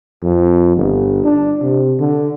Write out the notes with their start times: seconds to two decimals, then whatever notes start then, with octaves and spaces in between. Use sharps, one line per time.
0.22 F2
0.77 G1
1.24 D4
1.62 C3
2.00 D3